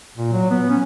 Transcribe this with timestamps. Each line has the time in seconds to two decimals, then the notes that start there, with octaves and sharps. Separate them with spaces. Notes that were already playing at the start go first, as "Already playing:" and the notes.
0.17 A#2
0.33 F#3
0.50 B3
0.70 C#4